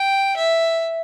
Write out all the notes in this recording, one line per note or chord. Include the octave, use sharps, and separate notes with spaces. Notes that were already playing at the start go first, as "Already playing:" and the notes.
Already playing: G5
E5